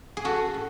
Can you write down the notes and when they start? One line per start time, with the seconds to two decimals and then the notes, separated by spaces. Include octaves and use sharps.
0.17 G#4
0.24 C#4 F#4 A4
0.54 A2